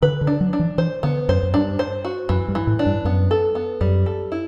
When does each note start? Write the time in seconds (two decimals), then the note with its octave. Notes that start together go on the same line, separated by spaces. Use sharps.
0.02 D3 B4
0.21 D3
0.27 D4
0.41 F#3
0.53 D4
0.59 E3
0.78 E3 C5
1.03 D3 B3
1.28 F#2 C5
1.43 F#2
1.54 G2 D4
1.79 C5
2.04 F#4
2.29 F#2 E3
2.48 G2
2.55 E3
2.67 A2
2.79 D4
2.86 G2
3.05 F#2 B3
3.31 A4
3.55 B3
3.81 F#2 G3
4.06 A4
4.32 E4